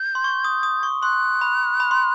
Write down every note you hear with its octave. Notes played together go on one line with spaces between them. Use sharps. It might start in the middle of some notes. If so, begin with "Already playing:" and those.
Already playing: G6
C6
C#6
D#6
D#6
C#6
C6 F#6
B5
B5
C6